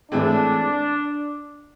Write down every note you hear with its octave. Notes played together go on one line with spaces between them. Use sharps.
A2 E3 G#3 C4 D4